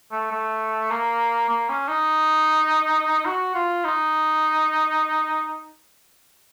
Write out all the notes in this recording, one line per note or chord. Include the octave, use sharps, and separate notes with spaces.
A3
A3
A#3
A#3
C#4
D#4
F#4
F4
D#4